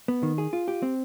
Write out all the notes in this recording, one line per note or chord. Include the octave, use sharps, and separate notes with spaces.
B3
D#3
G#4
F4
G4
C4